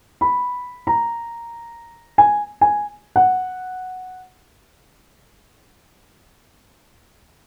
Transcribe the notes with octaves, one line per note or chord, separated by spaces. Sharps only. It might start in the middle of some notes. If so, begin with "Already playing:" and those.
B5
A#5
G#5
G#5
F#5